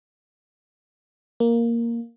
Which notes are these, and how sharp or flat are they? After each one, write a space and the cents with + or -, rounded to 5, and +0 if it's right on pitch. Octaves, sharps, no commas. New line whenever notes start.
A#3 +0